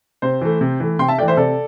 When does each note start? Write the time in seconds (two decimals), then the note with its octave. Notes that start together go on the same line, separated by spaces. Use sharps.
0.22 C3 C5
0.41 E3 A3
0.61 C3
0.80 E3 A3
0.99 C3 G5 C6
1.08 E5 A5
1.18 A3 D5 G5
1.22 E3
1.28 C5 E5
1.37 C3 A4 D5